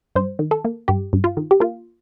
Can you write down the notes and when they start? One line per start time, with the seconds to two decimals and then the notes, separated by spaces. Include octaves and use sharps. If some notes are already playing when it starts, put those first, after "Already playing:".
0.16 G2 C5
0.39 D#3
0.51 A4
0.65 A#3
0.88 G2 G4
1.13 G2
1.24 F4
1.37 D#3
1.51 G4
1.60 A#3 F4